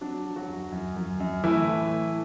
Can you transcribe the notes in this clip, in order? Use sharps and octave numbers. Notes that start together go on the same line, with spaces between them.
F#3 D4
F#3
F#3 F#4
F#2
F#2
F#2
F#2
E3 A3 E4
A2
A3